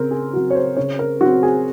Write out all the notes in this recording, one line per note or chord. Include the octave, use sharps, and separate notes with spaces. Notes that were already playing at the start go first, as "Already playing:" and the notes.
Already playing: C#3 C4 A#4
G#4
F#3 C4 F#4
C#5
C5
C#3 C#5
A#4
F#3 C4 F#4
G#4